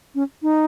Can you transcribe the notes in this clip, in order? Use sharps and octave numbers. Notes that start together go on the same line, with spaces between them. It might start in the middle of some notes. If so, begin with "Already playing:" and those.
C#4
D#4